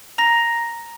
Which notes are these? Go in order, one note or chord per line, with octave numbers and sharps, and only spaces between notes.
A#5 A#6